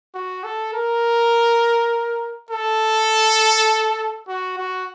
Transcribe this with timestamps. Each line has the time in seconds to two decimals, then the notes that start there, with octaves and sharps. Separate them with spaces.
0.14 F#4
0.44 A4
0.73 A#4
2.51 A4
4.28 F#4
4.58 F#4